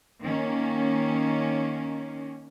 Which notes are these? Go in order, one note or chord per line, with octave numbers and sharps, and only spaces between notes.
D#3 A#3 C#4